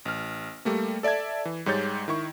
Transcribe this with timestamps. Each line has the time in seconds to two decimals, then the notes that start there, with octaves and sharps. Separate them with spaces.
0.05 A1 F6
0.65 G3 A3 A#3
1.03 A4 D5 E5 A5 G#6
1.45 E3
1.66 G#2 G3 G#3 C#5 G6 A6
2.08 D#3 E4 C#6